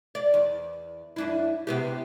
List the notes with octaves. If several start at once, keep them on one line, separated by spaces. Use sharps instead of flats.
D5
E2
F#2 D4 E4
C3 B3 G4